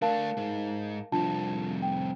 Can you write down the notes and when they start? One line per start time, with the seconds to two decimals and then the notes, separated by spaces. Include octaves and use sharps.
0.02 A3 D4 A#4 F5 A5
0.37 G#2
1.12 C2 F2 D4 F4 A5
1.82 G5